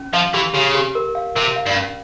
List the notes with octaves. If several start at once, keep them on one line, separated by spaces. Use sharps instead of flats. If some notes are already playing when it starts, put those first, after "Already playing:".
Already playing: C#4
F3 F5
E3 G4
C#3 G4
G4
A#4
F5
C3 A#4
F5
G2
C#4